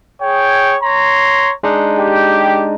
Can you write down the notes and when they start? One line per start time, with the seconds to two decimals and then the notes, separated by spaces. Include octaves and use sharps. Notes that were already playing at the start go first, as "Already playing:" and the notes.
0.21 G#4 C#5 G5
0.83 C#5 A#5 C6
1.63 G#3 D4 D#4
1.99 G4